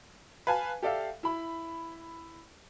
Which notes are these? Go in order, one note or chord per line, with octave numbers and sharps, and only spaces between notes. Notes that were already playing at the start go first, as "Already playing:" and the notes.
B4 F5 G#5 A5
G4 A4 D5 E5 F5
E4 B5